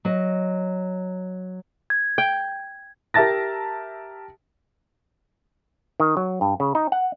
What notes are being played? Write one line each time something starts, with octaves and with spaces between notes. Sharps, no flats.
F#3 D#5
G#6
G5
G4 A#4 E5 A5 A6 A#6
D#3
F#3
G2
C#3
D#4
F#5